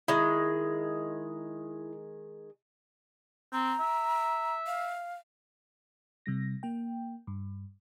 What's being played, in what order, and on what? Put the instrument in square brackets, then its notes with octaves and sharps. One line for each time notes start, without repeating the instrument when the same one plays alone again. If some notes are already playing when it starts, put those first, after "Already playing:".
[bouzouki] D#3 G#3 [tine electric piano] E4
[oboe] C4 [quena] A#5
[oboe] E5
[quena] F5
[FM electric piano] C3 G3 A#6
A#3 G5
G2